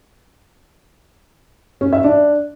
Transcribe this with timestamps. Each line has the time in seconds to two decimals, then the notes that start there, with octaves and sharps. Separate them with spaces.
1.81 C#4
1.93 E5
2.04 D4